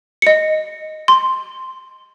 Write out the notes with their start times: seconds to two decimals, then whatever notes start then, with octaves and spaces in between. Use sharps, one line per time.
0.22 D#5 C#7
1.08 C6